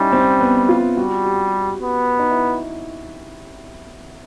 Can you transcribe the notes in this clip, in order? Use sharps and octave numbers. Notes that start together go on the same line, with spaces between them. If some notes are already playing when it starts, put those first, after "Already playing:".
Already playing: G3 C#4 D#4 E4
C4
B3
F4
G3 F#4
G4
B3
D#4
E4